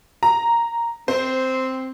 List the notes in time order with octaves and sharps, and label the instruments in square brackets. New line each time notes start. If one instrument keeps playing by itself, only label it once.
[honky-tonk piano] A#5
[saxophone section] C4 [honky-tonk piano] C5